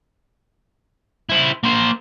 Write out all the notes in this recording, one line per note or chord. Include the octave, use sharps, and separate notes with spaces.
E4 C5
A#3 C5